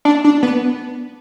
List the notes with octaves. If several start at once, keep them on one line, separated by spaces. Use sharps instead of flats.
D4
D4
B3